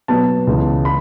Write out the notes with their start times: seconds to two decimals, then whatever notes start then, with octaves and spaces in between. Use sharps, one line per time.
0.08 B2 F#3 B3 A5
0.47 C#2 C#3 E3 B3
0.85 B5